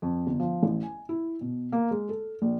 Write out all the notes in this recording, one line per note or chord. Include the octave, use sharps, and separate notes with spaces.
F2
G1
F3
A1
G#5
E4
B2
A#3
G#3
A4
A#1